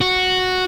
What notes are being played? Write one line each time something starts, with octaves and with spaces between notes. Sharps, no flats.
F#4